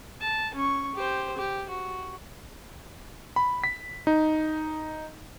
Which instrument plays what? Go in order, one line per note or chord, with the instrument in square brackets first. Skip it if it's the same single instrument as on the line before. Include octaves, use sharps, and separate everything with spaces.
[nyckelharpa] A5
C#4 C#6
G4 C5
G4
F#4
[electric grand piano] B5
B6
D#4